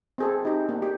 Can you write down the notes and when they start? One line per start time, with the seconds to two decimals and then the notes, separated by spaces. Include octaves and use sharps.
0.18 C4 G#4 A4
0.45 D#4 G4
0.69 A#3 D4
0.82 G4